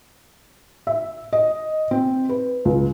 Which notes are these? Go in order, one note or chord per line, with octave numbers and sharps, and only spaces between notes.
E5
D#5
C4
B4
C#2